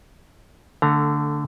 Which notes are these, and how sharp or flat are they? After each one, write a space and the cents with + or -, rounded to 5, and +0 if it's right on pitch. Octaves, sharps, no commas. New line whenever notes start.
D3 -5 A3 +15 A#5 +0